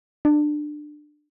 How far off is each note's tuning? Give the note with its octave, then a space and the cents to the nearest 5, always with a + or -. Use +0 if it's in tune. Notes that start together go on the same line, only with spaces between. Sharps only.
D4 +20